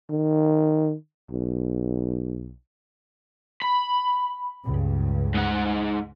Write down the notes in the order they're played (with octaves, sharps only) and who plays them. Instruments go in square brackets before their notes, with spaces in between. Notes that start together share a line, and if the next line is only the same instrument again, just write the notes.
[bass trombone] D#3
B1
[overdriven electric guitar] B5
[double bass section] C#2 G2 C#3
[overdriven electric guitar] G#2 F#5